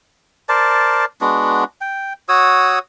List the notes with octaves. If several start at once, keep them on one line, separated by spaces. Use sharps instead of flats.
A#4 C5 D5 A5
G#3 B3 D4 F#4
G5
F#4 C#5 D#6 E6